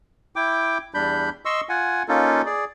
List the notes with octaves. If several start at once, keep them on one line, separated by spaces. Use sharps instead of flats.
E4 G5 D6
E2 G3 D4 B5 G6
D#5 C6 C#6 E6
F4 F#5 G#5
A#3 C#4 D#4 F4 A4
G#4 D5